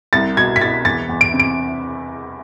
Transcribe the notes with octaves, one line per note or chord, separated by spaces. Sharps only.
C2 A6
B2 G#6
B6
B2 A6
E2 A6
E2
D7
C3
D7